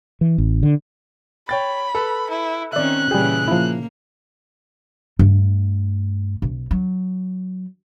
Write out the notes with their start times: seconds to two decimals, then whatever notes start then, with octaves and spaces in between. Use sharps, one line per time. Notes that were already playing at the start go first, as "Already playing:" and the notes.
0.21 E3
0.38 A1
0.63 D3
1.49 C#5 G5 B5 A6
1.95 A4 B4
2.30 E4
2.73 D#3 C4 C#4 D5 E5 F#6
3.11 A#2 C#3 E3 G3 G#4 G5
3.48 F3 A#3 E4
5.19 G2 A3
6.42 B1
6.71 F#3